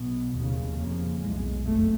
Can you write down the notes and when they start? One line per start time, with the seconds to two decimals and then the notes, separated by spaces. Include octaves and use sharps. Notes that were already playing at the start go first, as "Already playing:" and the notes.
Already playing: B1 B2
0.35 F1 D#2 C#3
0.79 F1 F2 C#3 A#3
1.22 B1 A2 G#3
1.65 F#1 F2 A3